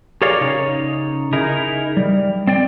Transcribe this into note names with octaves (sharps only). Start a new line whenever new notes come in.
G4 G#4 A#4 C#5 D5 F5
C#3 D#4 C#5
D#4 E4 G#4 A#4
G3
C4 D5 G5